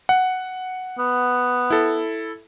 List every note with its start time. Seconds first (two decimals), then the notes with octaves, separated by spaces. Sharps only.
0.09 F#5
0.99 B3
1.70 E4 A4